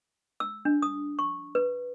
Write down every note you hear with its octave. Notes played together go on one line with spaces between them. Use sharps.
E6
D4
D#6
C#6
B4